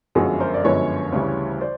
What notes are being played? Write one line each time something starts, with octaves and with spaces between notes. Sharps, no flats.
G1 F#2 D3 F3 G#3 F#4 G#4
A#4 C5
D5
G1 F#2 D3 F3 G#3 B4 C#5
D2 C#3 E3 G3
C5 D5